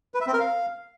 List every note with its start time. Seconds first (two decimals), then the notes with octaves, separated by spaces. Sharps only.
0.14 B4
0.21 E5
0.27 C4
0.33 A#4
0.40 F5